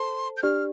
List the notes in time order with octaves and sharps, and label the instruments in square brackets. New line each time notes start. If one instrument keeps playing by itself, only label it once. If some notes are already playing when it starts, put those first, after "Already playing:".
Already playing: [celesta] A4 C5 A5 [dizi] C6
[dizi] G6
[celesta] D4 G4 D5 [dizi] F6